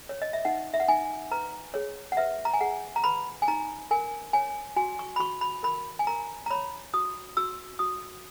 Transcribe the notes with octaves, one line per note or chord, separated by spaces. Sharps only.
C#5
D#5
E5
D#4 F#5
E5
F#5
D#4 G#5
B4 A#5
G#4 C#5
F#5
B4 E5
A#5
G#5
G#4 F#5
A#5
B4 B5
G#5
D#4 A#5
A#4 G#5
C#5 G#5
F#4 G#5
C#6
B5
F#4 C#6
B5
A#4 B5
G#5
A#4 A#5
A#5
C#5 B5
F#4 D#6
F#4 E6
F#4 D#6